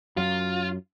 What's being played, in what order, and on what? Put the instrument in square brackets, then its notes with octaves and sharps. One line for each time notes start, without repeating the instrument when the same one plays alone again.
[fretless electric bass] F#2 F#3 [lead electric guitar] F4